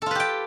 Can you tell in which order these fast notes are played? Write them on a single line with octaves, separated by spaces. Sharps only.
A4 F4 B4 G4 G5